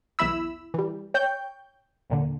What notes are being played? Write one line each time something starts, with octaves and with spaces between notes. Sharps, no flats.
B1 E2 E4 B5 E6
E3 G3
C#5 G5 G6
D#2 A#2 D3